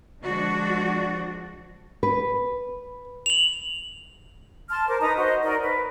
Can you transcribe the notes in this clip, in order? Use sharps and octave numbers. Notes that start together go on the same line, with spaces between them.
D3 F3 G#3 D4 F#4
B4
F7 F#7
A5 C6 F6
A#4 C5 D6
D#4 B4 A#5 D#6
F#4 C5 D#5
D#4 F#4 A#4 D5
B4